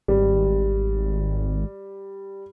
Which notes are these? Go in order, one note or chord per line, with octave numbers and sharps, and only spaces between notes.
G#1 G3